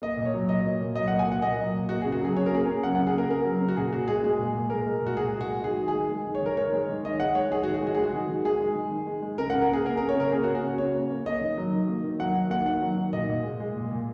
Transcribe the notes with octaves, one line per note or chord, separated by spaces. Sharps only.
A#3 D#5
A#2
C#5
F#3
A#2 D#5
A#3
A#2
F#3 D#5
A#2 F#5
G#5
A#3 F#5
A#2 D#5
F#3
A#2
A#3 F#4
C#3 G#4
F#4
F#3 G#4
C#3 C#5
A#4
A#3 G#4
C#3 A#4
F#3 F#5
C#3 F#5
G#4
A#3 A#4
C#3 A#4
F#3
C#3
F#4
A#2 G#4
A#2 F#4
G#3 G#4
G#3 G#4
A#2
A#2
G#3 A#4
G#3
A#2 F#4
A#2 G#4
G#3
F#4
G#3
D#3 G#4
D#3
G#4
G#3
G#3
D#3
C#5
D#3 A#4
G#3 C#5
G#3
D#3
D#3 D#5
G#3 F#5
G#3 C#5
D#3 G#4
D#3 F#4
G#4
G#3 F#4
G#4
G#3
F#4
D#3
D#3
G#3 G#4
G#3
D#3
D#3
G#3
G#3
C#3 A#4
C#3 F#5
A#4
A#3 G#4
A#3 A#4
C#3 A#4
C#5
C#3 A#4
A#3 G#4
F#4
A#3
F#4
C#3
C#3 C#5
A#3
A#3
A#3 D#5
D#3
F#3
D#3
A#3
D#3
F#3 F#5
D#3
A#3 F#5
D#3 F#5
F#3
D#3
A#2 D#5
A#2
G#3
G#3
A#2
A#2